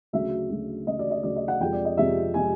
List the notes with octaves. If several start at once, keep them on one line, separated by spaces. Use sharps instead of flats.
D2 C#3 F#3 E5
D2 C#3 F#3
D2 C#3 F#3 D#5
D5
D#5
D2 C#3 F#3 D5
D#5
F#5
F2 C3 F3 G#3 G5
D5
D#5
F2 C3 F3 G#3 E5
C3 F3 G#3 G#5